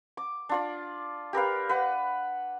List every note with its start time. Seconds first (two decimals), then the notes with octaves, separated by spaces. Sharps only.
0.17 D6
0.49 D4 F4 D5
1.33 G4 A#4 B4 F5
1.69 B4 F#5